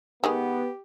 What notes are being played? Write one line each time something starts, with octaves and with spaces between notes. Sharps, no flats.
D#3 G#3 B3 G4 G#4